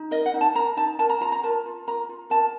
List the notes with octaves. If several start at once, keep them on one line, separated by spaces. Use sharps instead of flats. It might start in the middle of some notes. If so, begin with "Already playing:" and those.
Already playing: D#4
A#4 D#5
F#5
D#4
A5
A#4 A#5
D#4 A5
A#4 A5
A#5
F4 A#5
A#5
A#4 A5
F4
A#4 A#5
F4
A#4 A5